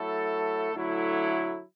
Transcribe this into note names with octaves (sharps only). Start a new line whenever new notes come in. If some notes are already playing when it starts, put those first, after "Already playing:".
Already playing: F#3 A3 E4 A4
D3 F#3 A3 E4